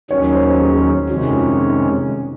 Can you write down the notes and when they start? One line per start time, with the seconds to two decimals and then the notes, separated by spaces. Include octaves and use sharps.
0.10 D#2 D#3 F#3 C#4 C#5
0.35 C5
0.60 G#4
1.09 F2 C3 D#3 G#3 C#4 F#4
1.35 F4
1.59 D#4